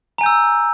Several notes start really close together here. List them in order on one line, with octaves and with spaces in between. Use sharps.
A#5 G#5 G6 E6